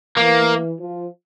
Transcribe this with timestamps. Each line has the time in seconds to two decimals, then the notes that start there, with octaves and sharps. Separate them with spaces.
0.17 E3 A#3
0.78 F3